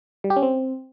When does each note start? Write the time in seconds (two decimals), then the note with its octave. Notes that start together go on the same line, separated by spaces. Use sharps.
0.24 G3
0.30 G4
0.36 C#4
0.43 C4